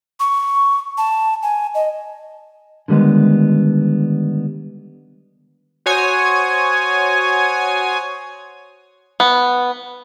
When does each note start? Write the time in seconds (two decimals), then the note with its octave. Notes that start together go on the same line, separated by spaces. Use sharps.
0.20 C#6
0.98 A5
1.43 G#5
1.75 D#5
2.88 D3 D#3 G3 G#3 B3
5.86 F#4 C5 C#5 G#5 D#6
9.20 B3